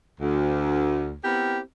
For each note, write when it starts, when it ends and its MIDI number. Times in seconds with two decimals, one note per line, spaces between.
0.20 1.15 38
1.24 1.59 59
1.24 1.59 60
1.24 1.59 64
1.24 1.59 67
1.24 1.59 70